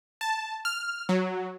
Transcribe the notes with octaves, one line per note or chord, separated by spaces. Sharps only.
A5
F6
F#3